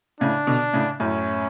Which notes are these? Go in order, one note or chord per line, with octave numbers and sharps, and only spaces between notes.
A2 C#3 D4
B2 D3
A2 C#3
F#2 A2 C#4